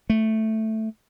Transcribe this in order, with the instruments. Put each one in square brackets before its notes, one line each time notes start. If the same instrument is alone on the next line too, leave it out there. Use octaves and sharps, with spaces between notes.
[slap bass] A3